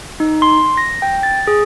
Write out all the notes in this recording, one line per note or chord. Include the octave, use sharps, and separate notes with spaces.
D#4
C6
A#6
G5
A6
G#4